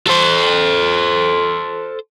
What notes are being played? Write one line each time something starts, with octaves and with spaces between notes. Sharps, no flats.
A4 C5